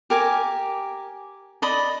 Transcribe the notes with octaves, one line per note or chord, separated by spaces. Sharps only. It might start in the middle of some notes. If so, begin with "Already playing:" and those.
G4 A#4 G#5 D6
D5 D#5 B5 D#6